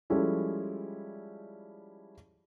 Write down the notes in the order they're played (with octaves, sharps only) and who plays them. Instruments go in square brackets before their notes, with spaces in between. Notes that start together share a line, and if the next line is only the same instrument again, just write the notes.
[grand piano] F3 G3 G#3 C#4 E4 A4